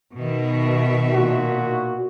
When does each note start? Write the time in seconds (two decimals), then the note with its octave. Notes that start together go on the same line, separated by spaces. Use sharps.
0.16 B2 D#3 E5
1.14 A#2 F#4